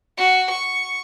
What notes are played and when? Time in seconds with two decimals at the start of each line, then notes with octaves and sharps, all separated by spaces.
0.18 F#4
0.50 C#6